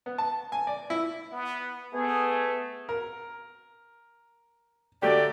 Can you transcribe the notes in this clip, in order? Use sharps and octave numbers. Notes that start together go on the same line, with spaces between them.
B3
A5
G#5
D5
E4
B3
A3 B3 G#4
A#4
D3 F#3 A3 G4 D5